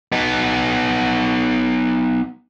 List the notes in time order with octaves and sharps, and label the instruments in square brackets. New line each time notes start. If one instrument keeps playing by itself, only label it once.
[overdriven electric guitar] B3 D#4